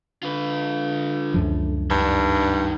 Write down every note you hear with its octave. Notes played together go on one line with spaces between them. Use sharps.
D3 F4 B4
C#2 F#2 F3
G2 D#3 D4